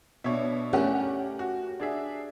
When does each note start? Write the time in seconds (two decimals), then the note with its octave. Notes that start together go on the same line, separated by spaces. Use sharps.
0.24 B2 D4 C#5 E5
0.73 A3 C#4 G4 A#4 F#5
1.39 F#4
1.80 D4 G#4 E5